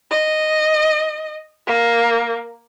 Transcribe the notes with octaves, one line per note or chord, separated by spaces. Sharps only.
D#5
A#3